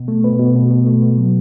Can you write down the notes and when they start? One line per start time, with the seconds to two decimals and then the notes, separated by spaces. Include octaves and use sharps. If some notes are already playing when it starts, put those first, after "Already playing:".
Already playing: B2
0.08 A3
0.24 B2 B4
0.39 B2
0.55 B2
0.70 B2
0.87 A3
1.02 B2
1.18 F#3